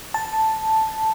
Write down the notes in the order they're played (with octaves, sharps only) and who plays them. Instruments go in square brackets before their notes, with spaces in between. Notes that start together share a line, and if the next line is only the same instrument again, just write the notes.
[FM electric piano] A5